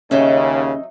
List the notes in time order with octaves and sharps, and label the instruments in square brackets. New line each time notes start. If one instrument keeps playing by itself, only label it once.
[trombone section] D#2 C#3 [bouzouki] F#3 D#4 E5 [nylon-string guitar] C#4